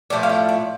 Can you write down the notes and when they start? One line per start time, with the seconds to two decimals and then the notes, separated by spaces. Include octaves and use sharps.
0.10 A2 F3 A3 D5
0.23 F5
0.29 D5
0.49 D5